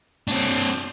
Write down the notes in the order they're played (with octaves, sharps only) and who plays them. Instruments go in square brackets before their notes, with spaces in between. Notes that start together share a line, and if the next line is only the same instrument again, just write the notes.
[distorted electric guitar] C4 D4